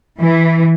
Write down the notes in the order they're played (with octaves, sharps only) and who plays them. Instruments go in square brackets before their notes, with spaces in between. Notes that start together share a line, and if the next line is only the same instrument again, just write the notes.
[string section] E3